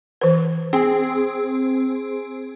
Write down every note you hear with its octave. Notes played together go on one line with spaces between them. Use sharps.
E3 B4
C4 G#4